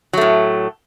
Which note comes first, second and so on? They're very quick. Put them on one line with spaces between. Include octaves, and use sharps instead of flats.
F#3 A3 A2